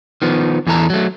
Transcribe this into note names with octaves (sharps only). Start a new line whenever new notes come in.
D#3 F3 B3
E2 E3 A4 A#5
F#3 A3